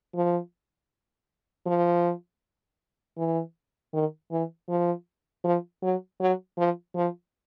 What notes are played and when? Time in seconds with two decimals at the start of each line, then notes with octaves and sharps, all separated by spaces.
0.15 F3
1.66 F3
3.17 E3
3.93 D#3
4.31 E3
4.69 F3
5.44 F3
5.82 F#3
6.20 F#3
6.58 F3
6.96 F3